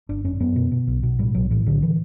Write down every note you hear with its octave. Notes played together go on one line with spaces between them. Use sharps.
G1 D4
F#2 C#4
F#2 B3
B2
B2
B1
B2
A2 G3
B1 F#3
A2 E3
B1 D3
E3